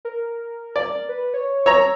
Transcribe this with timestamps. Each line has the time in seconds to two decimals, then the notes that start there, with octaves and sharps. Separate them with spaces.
0.05 A#4
0.76 D5
1.09 B4
1.34 C#5
1.66 C#5 A#5 E6